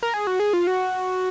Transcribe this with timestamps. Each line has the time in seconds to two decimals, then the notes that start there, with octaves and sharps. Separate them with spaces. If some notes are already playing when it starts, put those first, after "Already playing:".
0.03 A#4
0.14 G#4
0.27 F#4
0.40 G#4
0.53 F4
0.67 F#4